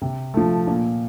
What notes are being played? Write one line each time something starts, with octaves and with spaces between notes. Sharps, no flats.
C3
F3 A3
A#2